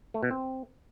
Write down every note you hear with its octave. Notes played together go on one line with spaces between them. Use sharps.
A3
B2
C4